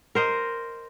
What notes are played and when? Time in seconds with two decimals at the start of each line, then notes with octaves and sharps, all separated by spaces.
0.15 A#4 C5 D#5